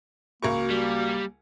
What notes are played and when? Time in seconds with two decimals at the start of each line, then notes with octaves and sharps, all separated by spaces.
0.43 C#2 A#3 F#4 A#4 C#6
0.70 G3